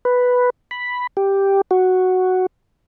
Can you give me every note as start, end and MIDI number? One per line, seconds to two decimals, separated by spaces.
0.05 0.50 71
0.71 1.07 83
1.17 1.61 67
1.71 2.46 66